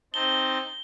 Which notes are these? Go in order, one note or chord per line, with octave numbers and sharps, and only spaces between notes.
C4 D#4 A5 G7